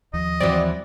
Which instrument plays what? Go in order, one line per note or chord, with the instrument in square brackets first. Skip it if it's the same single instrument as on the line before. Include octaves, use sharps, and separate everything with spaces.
[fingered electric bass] D#2 F3 [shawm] D#5
[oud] E3 F#3 C4 [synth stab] D5